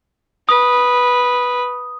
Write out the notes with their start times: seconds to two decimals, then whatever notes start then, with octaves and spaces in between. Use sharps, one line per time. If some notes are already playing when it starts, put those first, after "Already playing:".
0.49 B4 D#6